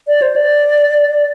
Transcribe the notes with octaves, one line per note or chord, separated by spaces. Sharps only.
D5
C5
D5